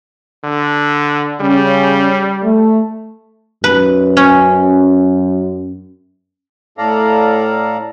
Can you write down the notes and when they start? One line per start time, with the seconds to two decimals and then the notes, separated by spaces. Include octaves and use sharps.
0.44 D3
1.41 C#3 G3 C#4
2.43 A3
3.64 F#2 B4
4.17 C#4
6.78 A2 A4 D5 F5 A#5